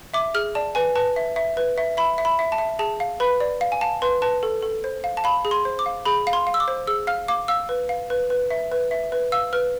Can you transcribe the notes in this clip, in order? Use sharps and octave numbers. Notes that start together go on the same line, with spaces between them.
E5 D6
G#4 F6
D5 A5
B4 G#5
B4 A5
E5
E5
B4
E5
E5 B5
E5
B5
E5
A5
E5
G#4 A5
F5
B4 B5
D5
F5
G#5
F5 A5
B4 C6
B4 A5
A4
A4
C5
F5
A5
F5 B5
G#4
C6
C5
D6
F5
G#4 B5
F5
C6
F5
E6
D6
C5
G#4 E6
F5 F6
F5 D6
F5 E6
B4
F5
B4
B4
E5
B4
E5
B4
F5 E6
B4 F6